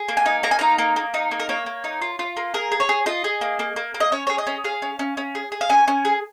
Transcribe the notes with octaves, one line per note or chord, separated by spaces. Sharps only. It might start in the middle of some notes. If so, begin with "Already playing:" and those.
Already playing: G#4
A#3
G#5
D#4
A#3 A#5
G#5
D#4 A#5
A#3
A#3
D#4
A#3
A#4
A#3 C#5
A#3
D#4
F4
F4
A#3
G#4 A#4
G#4
C#5
G#4
F4 D#5
G#4
A#3
A#3
A#3
A#3
D#5
C#4 C#5
G#4 C#5
D#5
C#4
G#4 F5
C#4
C#4
C#4
G#4
G#4
F5
C#4 G#5
C#4
G#4